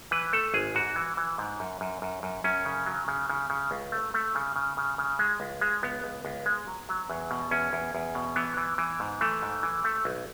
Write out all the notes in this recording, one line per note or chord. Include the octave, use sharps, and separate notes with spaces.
E3 B4
A3 A4
G#1 G#4
G#2 F#4
E3
E3
G#2
F#2
F#2
F#2
F#2
F#2 C#4
C#3
F#3
C#3
C#3
C#3
C#2
A3
A3
C#3
C#3
C#3
C#3
G#3
C#2
G#3
C#2 B3
C#2
C#2
G#3
F#3
F#3
E2
B2
E2 C#4
E2
E2
B2
E3 B3
E3
E3
G#2
E3 A3
G#2
E3
A3
B1